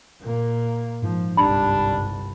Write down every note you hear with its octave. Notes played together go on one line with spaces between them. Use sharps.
A#2 A#3
G#2 F3
G1 C2 G3 D4 B5